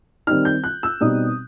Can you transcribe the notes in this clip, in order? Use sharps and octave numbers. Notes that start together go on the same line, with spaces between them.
D#3 G3 C4 D#4 F6
G6
F#6
E6
B2 G3 C4 D#4 D#6